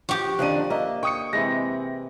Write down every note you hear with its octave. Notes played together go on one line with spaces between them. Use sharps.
F3 F#4 G4
F2 D3 D#3 F3 D4 F#6 D#7
A#3 D#5 E5
G5 C#6 D#6 C#7
C3 E3 G#3 C4 A#6